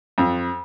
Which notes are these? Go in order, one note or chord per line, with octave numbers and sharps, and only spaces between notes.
F2